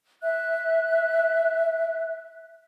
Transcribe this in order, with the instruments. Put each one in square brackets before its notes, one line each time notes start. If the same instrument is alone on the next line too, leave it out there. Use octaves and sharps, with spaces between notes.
[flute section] E5 F#6